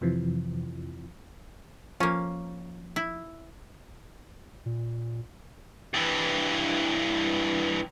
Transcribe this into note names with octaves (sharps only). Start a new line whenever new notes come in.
F2 C3 E3 F3
F3 A#3 C#4
E4
A#2
G2 E3